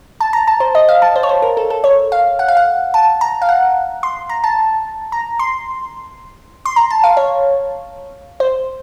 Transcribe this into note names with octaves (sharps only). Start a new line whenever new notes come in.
A5
A#5
A5
C5
D#5
F5
A5
C5
C#5
C5
A#4
A4
A4
C#5
F5
F#5
F5
F#5
A5
A#5
F5
F#5
C6
A#5
A5
A#5
C6
C6
A#5
A5
F5
C#5
C5